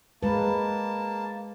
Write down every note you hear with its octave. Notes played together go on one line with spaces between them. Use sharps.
G#3 A#3 B4 A5